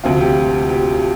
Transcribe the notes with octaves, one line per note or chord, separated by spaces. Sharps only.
D2 C3 F3 F4
G4
G4